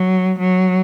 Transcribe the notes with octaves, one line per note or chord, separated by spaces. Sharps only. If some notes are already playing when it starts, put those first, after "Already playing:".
Already playing: F#3
F#3